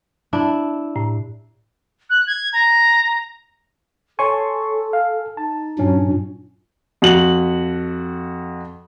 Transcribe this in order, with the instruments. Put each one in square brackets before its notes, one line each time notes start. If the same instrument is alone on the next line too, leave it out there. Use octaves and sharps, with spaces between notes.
[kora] D4 E4
[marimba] A2
[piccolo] F#6
G#6
A#5
[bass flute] A4 [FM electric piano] C#5 C6 C#6 [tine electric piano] G#5 A5
[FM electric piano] F5
[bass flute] D#4 [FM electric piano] A5
[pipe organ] G2 A#2 [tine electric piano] F#3 C#4
[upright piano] F2 F#4 F#7